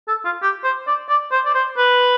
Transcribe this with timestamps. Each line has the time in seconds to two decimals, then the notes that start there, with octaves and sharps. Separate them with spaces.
0.08 A4
0.25 F4
0.42 G4
0.64 C5
0.87 D5
1.09 D5
1.32 C5
1.45 D5
1.55 C5
1.78 B4